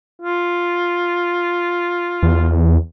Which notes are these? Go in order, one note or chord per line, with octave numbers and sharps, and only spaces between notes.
F4
E2